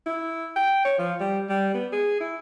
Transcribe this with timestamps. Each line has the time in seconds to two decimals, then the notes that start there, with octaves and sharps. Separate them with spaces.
0.06 E4
0.56 G5
0.85 C#5
0.98 F3
1.20 G3
1.49 G3
1.74 B3
1.92 G#4
2.20 E4